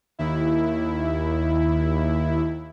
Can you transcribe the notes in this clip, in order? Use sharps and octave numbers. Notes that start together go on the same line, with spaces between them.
D#2 E4